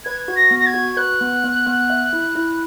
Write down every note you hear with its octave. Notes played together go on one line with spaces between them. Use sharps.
B4 G#6
F#4
A#6
B3
A#6
G#6
F#4
B4 F#6
B3
B3
B3
E5
E4
E4